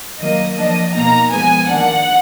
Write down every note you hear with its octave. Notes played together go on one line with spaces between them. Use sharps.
D#3 F#3 A#3 D#5
F3 A#3 D4 D#5
B2 A#3 D#4 A#5
F3 G#3 B3 G#5
D#3 A#3 D4 F#5